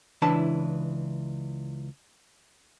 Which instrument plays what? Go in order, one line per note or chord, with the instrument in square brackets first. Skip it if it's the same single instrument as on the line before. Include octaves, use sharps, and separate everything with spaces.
[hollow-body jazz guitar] C#2 E3 D4 E4 B4 A5